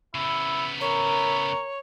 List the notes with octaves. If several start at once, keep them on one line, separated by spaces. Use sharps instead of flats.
C#3 B3 E4
E4 A#4 C#5